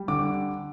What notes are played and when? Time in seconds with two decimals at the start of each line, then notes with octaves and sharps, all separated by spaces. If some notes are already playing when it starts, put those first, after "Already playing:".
Already playing: G3
0.08 D3 D6